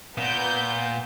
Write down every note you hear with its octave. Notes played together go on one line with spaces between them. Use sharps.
A#2 B3 G6